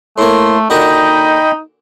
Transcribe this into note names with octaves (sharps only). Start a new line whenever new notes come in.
A2 A3 A#3 C6
A#2 D3 D#4 F#4 D#5 G5 B5